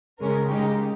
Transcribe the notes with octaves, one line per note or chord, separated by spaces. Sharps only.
C#3 G#3 C#4 A#4
C#3 G#3 D#4 G4